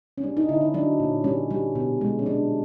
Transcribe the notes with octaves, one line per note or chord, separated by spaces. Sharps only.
C#4
G3 D4
D#4
D3 E4
D#4
F#3 D4
A#2
G3 C#4
G3
B2
G#3
C#4
F#3 D4